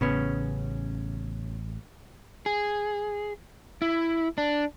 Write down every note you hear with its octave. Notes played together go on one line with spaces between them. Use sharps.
A1 C#3 B3 C#4
G#4
E4
D4